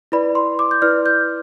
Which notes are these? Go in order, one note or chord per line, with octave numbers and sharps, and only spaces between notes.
E4 B4 D5 B5
C6
D6
G6
E4 B4 D5 F6
G6